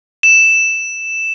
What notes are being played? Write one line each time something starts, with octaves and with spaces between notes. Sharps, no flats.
E7